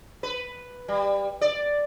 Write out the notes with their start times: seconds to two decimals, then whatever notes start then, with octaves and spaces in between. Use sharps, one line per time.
0.23 B4
0.88 G3
1.41 D5